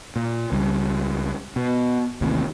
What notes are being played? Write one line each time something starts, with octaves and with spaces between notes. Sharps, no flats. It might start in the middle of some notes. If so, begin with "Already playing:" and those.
A#2
C#2 G3
B2
A1 D#2 A2 C3